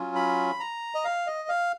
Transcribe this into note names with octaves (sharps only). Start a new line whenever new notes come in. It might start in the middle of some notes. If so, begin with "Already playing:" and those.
Already playing: F#3 C#4 F4
B5
A#5
D#5
F5
D#5
F5